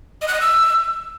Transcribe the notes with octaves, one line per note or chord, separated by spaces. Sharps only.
D#5
F#6
D#5
E6